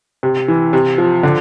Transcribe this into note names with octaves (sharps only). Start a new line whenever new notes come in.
C3
E3
C3
F3
D3